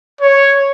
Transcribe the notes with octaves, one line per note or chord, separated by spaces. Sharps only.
C#5